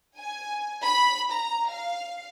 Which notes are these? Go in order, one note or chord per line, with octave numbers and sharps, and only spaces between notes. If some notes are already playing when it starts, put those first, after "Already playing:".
G#5
B5
A#5
F5